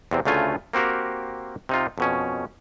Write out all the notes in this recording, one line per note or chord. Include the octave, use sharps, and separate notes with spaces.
E2 C3 C4
D2 C#3 A3 F4 G#5
A#3 C4 F#4 G4 A#4
C3 D#4 F4
F2 B2 C#4